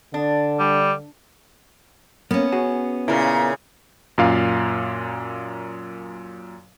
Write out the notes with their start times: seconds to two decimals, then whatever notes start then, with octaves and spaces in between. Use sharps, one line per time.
0.14 D3 D4
0.60 G3
2.31 A#3 B3 C#4
2.52 F#4 G#4
3.08 A#2 C#3 E4 A#4
4.18 F#2 A#2 F5